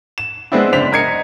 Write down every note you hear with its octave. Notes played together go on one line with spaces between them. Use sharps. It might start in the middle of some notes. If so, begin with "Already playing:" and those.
E7
G#3 B3 C4 D4 E4
F#1 D4 C5 B6 F7
A#4 D#5 G#6 C7 C#7